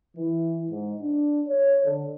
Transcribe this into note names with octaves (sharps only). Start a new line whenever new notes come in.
E3
G#2
D4
C#5
D3